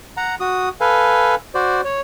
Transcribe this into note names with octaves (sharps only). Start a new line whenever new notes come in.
F#5 A#5
F#4 D#6
A4 B4 F5 G#5
F#4 C5 D5
C#5